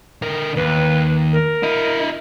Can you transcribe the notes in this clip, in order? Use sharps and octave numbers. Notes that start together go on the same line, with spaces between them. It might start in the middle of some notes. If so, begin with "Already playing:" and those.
D3 A#4
D#2 B4
A#4
E4 D#5